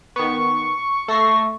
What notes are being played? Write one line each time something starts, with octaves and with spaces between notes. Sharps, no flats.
D#3 B3 C#6
A3 A4 C#6 A#6 C7